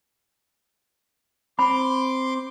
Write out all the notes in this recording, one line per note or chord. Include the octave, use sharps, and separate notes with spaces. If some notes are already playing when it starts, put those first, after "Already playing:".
C4 B5 C6 D6 D#6